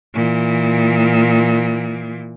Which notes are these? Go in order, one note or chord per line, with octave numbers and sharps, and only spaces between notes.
A#2 E3